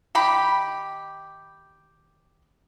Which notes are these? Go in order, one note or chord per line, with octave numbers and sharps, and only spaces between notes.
D#3 G4 B5